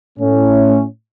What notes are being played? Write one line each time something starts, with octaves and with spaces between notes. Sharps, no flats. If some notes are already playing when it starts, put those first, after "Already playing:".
A2 A3 C#4